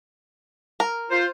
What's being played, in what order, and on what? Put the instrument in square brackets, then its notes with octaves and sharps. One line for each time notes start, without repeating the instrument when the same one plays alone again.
[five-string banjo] A#4
[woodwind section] F4 C5